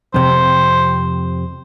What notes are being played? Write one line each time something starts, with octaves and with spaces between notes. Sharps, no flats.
F2 C3 C4 C5